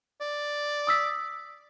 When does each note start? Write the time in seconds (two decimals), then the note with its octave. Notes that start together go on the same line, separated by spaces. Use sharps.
0.21 D5
0.87 D#6 E6 B6